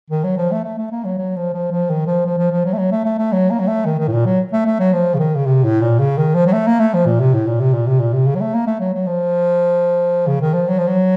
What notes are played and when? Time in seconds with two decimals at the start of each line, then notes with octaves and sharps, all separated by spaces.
0.11 D#3
0.24 F#3
0.38 F3
0.51 A3
0.64 A3
0.78 A3
0.91 A#3
1.05 F#3
1.18 F#3
1.36 F3
1.54 F3
1.72 F3
1.90 D#3
2.07 F3
2.26 F3
2.38 F3
2.52 F3
2.65 F#3
2.73 A3
2.78 F#3
2.91 A3
3.05 A3
3.18 A3
3.32 F#3
3.50 A#3
3.59 F#3
3.68 A3
3.86 D#3
3.99 D#3
4.08 A2
4.13 A#2
4.26 F#3
4.53 A3
4.66 A3
4.80 F#3
4.93 F3
5.14 C#3
5.19 D#3
5.35 C#3
5.46 C3
5.64 A2
5.81 A#2
5.99 C#3
6.18 D#3
6.35 F3
6.46 F#3
6.53 A3
6.67 A#3
6.80 A3
6.94 F3
7.06 A#2
7.20 C3
7.34 A2
7.47 A#2
7.60 C3
7.74 A#2
7.87 C3
8.00 A#2
8.13 C3
8.27 C#3
8.36 F#3
8.41 A3
8.54 A#3
8.67 A3
8.80 F#3
8.94 F#3
9.07 F3
10.27 C#3
10.41 D#3
10.54 F3
10.68 F#3
10.78 F3
10.87 F#3